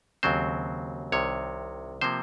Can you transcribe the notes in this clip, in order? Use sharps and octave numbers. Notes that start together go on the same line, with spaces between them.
D#2 C#3 F#3 C4 C5
C2 C3 D#3 C#5
C3 F3 A#3 C5